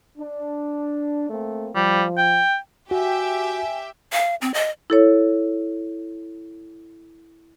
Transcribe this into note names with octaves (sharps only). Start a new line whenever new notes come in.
D4
A3 A#3 C4
F3 G3
G5
F#4 G4 E5 G5 G#5
F5
C4
D#5
E4 A4 C#5